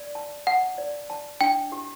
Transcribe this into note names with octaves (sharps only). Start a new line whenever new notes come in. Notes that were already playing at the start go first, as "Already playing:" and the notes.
Already playing: D5
A5
F#5 A5
D5
A5
D4 G5
G4